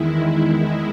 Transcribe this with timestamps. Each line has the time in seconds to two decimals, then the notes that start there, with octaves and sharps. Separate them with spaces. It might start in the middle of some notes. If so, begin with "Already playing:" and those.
Already playing: E2 D#3 G#3 E4